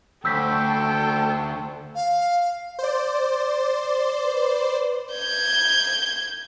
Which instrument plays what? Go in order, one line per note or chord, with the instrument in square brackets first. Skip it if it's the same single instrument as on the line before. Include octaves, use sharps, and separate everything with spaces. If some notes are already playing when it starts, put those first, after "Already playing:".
[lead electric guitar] D2 [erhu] A4 [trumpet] G5 [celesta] E6 G6 B6
[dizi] F5
[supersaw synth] C5 D5
[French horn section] B4
[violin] G6 G#6